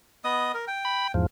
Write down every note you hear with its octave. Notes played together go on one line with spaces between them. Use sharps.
B3 D#5 D#6
A#4
G5
B5
E2 G#2 F3